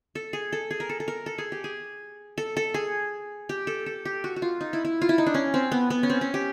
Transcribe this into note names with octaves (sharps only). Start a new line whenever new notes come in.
A4
G#4
A4
G#4
A#4
A4
A4
A#4
A4
G#4
G4
G#4
A4
A4
G#4
G4
A4
A4
G4
F#4
F#4
F4
D#4
E4
E4
F4
E4
D#4
D4
C#4
C4
B3
B3
C#4
C4
C#4
G4